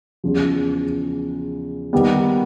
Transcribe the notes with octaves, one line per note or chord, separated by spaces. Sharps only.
E2 C#3 F3
D#3 G3 B3